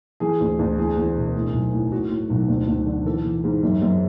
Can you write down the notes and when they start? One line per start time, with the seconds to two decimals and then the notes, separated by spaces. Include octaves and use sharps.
0.20 E3 G#4
0.41 D2
0.59 D2
0.78 E2 G#4
0.97 E2
1.16 E1
1.35 A2
1.53 B1
1.73 A2
1.92 A2 F#4
2.10 A2
2.30 B1
2.48 D2
2.67 D2
2.86 D3
3.06 E3 A4
3.24 E3
3.44 G#2
3.63 F#2
3.82 F#2